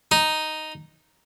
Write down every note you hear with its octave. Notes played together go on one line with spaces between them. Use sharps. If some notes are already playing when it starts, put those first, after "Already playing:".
D#4